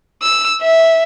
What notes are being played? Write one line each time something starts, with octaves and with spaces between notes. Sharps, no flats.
E6
E5